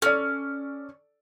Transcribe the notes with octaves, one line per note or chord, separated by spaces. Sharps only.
C#4 A4 D5